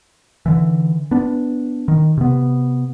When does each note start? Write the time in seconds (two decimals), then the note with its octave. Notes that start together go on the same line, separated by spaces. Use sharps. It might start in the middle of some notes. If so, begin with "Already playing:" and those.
0.46 D3 E3
1.11 B3 D4
1.88 D#3
2.18 C3 B3